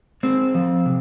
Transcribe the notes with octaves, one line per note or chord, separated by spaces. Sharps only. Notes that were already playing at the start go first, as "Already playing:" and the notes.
G#3 C4
F3
C3